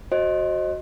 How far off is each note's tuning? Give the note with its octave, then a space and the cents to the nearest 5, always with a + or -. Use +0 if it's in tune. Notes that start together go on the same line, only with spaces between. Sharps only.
F#4 +0 C5 +35 D#5 +0